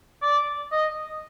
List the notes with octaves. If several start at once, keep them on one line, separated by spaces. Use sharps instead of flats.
D5
D#5